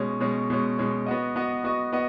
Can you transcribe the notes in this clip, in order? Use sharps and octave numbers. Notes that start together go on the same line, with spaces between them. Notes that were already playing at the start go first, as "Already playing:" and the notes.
Already playing: B2 G#3 C#4
B2 G#3 C#4
B2 G#3 C#4
B2 G#3 C#4
B3 F#4 D#5
B3 F#4 D#5
B3 F#4 D#5
B3 F#4 D#5